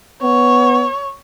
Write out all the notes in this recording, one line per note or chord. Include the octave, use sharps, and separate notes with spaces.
B3 C#5